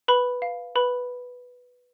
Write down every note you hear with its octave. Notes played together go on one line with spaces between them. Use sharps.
B4 B5
F5
B4 B5